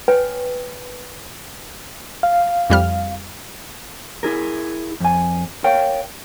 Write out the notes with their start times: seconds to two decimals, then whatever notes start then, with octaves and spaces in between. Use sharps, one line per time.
0.08 B4 C#5 G5 G#5
2.23 F5
2.70 F2 G3 F6
4.23 E4 G#4 A#4
5.00 F2 G#5
5.64 A#4 C#5 F5 G5